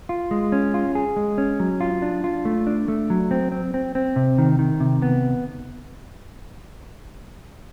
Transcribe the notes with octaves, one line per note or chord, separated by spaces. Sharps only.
F4
G#3
C#4
F4
G#4
G#3
C#4
F#3
F4
D4
F4
A3
D4
A3
F#3
C4
C4
C4
C4
C3
D#3
D#3
C3
B3